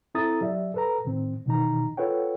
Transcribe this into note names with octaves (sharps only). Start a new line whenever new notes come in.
C4 E4 A4 A#5 D#6 A6
F#3 G4 D5 E5
A4 B4 A#5
A2 D#3 C4
B2 D#3 E3 D#4 A#5
F4 A4 B4 C#5 F#5 G5